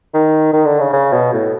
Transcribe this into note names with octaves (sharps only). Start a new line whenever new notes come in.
D#3
D#3
D3
C#3
C#3
B2
A2